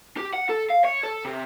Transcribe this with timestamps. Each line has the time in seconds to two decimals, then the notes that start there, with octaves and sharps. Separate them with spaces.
0.17 G4
0.34 F#5
0.49 A4
0.70 F5
0.84 C#5
1.03 A4
1.25 C3